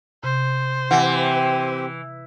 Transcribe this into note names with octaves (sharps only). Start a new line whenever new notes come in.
C3 C5
E3 C4 G4 F#5